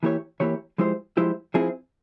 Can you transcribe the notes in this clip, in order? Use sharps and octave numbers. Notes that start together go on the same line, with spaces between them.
E3 A#3 E4 G4 C#5
E3 A#3 E4 G4 C#5
F3 G#3 E4 G4 C5
F3 G#3 E4 G4 C5
F3 C4 E4 G#4